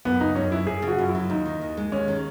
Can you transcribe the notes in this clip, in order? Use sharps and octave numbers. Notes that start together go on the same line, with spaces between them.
F#2 B3
C#3 D#4
F#2 C#4
F#3 E4
F#2 G#4
C#3
F#4
F#2
E4
F#3
D#2 D#4
D#3
D#2
G#3
D#2 C#4
D#3